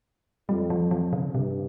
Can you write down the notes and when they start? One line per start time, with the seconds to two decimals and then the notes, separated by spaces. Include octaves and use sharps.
0.49 F2 G3
0.70 F3
0.91 F3
1.13 C#3
1.35 G2 C3